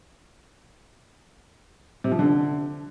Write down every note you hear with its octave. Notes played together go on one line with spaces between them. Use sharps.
C3
F3
D3